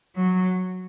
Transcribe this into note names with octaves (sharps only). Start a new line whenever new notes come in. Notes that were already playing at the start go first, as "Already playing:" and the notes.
F#3